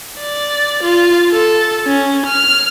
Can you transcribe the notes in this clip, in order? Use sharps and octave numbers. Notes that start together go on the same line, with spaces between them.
D5
F4
A4
C#4
F6